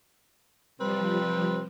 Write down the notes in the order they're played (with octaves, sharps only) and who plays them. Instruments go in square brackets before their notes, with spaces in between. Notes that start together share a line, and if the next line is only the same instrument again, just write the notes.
[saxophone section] C3 C4 B4 [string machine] F3 G3